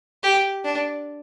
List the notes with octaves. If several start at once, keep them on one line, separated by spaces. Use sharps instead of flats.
G4
D4